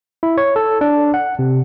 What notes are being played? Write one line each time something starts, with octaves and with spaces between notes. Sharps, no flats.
E4
C#5
A4
D4
F#5
C3